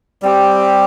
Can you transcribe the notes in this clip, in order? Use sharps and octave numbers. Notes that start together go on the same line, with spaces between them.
G3 C4 G4